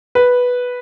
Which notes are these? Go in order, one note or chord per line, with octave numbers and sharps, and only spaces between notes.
B4